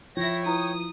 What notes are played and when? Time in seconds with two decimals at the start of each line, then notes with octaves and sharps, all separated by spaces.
0.17 F3 E4 C#5 G5 A#6
0.46 E4 B4 D#6